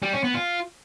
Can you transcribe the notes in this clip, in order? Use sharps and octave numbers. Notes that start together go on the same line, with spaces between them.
G3
C#4
B3
F4